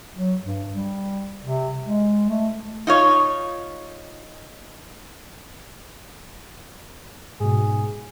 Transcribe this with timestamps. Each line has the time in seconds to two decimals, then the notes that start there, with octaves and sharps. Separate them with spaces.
0.16 F#3
0.42 G2
0.72 G3
1.41 C3
1.87 G#3
2.29 A3
2.87 D#4 F4 C#5
7.40 G#2 B2 G#4